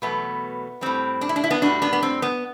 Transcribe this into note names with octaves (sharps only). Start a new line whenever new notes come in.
E2 B2 F#3 A3 B3
A2 G3 C4
D4
E4
D4
E4
B3 D4
A2 G3 D4 F#4
B3 D4
B3
C4
B3